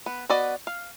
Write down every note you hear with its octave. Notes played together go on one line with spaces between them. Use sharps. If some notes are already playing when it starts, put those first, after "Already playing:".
B3
B3 F#4 D5 D#5
F5